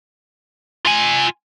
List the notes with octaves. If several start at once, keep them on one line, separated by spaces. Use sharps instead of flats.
F4 G#5